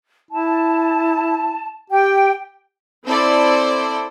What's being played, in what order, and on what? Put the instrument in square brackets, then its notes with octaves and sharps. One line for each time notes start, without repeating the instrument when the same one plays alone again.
[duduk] E4 [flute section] A5
[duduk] G4 [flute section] G5
[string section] C4 E4 A4 C5 D5